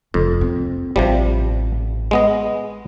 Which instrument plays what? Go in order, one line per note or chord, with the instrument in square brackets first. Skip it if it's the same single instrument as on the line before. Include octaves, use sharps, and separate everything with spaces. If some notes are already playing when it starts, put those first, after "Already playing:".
[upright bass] F1 [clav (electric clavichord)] F2
[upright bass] C4
[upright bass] A1 [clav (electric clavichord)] C3 F3 G3
[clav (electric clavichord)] G#3 B3 D#5